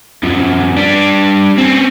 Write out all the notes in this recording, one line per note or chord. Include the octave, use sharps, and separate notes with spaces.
F#2 F3
G3 D4
C4 C#4